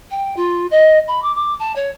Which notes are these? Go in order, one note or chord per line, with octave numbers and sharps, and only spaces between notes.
G5
F4
D#5
B5
D6
D6
A5
C#5